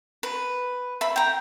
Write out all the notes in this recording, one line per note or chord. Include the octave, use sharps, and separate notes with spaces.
B4
E5 B5
G5 A#5